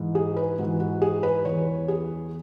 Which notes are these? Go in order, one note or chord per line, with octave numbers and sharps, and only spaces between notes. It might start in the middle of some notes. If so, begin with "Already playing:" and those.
Already playing: G#2 E3
G#4
B4
G#2 E3 F#4
F#4
G#4
B4
E2 E3 C#5
G#4